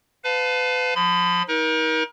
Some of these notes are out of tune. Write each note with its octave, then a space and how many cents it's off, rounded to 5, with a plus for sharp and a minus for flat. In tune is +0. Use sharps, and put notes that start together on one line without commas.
B4 +35 F5 +20 A5 +0
F3 +25 B5 +40
D#4 +35 A#4 +35